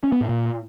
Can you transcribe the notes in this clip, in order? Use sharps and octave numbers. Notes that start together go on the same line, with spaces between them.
C#4
B3
A2
A#2